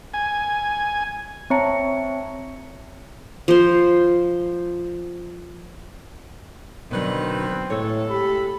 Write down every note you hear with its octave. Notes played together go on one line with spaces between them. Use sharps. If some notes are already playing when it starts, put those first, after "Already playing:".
G#5
C4 C#5 E5 A5 A#5 C#7
F3 C5
B2 D3 D#3 F#3 C4 B4
A2 G#3 A4 C#5
G4 B5